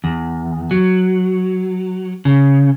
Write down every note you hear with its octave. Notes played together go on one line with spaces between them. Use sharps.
E2
F#3
C#3